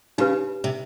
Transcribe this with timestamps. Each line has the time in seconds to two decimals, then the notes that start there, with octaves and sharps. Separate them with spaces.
0.18 C#3 D#4 G4 B4
0.64 C3